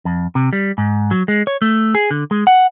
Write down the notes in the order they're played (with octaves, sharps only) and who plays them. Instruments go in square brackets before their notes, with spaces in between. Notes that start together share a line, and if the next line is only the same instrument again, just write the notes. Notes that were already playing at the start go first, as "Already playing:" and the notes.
[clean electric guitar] F2
C3
G3
G#2
F#3
G#3
C#5
A3
G#4
D3
G#3
F#5